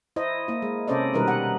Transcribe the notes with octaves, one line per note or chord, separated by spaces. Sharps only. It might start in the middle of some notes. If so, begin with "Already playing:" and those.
E4 C5 D#5
A#3 E4
G#3
C3 C#4 A4 C5 D5 D#5
B2 D#3 G3 D#4 A#4 B4
F#5